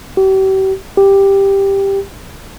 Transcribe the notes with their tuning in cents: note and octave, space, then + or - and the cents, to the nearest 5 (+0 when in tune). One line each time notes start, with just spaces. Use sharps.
G4 -40
G4 +5